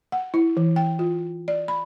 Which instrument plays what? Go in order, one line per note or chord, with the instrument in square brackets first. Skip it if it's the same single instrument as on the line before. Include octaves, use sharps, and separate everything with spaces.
[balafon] F#5
E4
E3
G5
F4
D5
B5